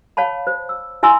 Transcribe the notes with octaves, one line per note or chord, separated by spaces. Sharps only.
C#5 F5 A5 B5
C5
E6
E4 E5 G#5 A#5 C6 E6